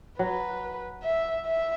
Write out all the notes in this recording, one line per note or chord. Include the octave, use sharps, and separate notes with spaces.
F#3 B4
E5
E5